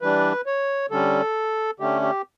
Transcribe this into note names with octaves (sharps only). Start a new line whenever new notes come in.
E3 G3 D4 B4
C#5
D3 G3 C#4 A4
D3 A3 C#4 G4
G4